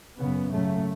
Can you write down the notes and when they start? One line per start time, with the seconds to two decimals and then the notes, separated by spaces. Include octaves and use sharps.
0.19 F#2 C#3 B3
0.51 F#2 C#3 A3